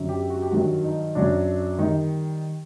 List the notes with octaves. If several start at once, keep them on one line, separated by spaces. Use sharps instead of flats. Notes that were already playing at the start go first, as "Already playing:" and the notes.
Already playing: F#2 D3 F#3
G4
F#4
G4
G2 D#3 F#3 F#4
D#4
F#2 D3 F#3 D4
D#3 G3 D#4